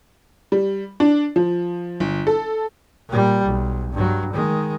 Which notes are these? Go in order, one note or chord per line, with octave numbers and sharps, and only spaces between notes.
G3
D4
F3
G1
A4
A#2 G3
B1
G2 F#3
D#3 G#3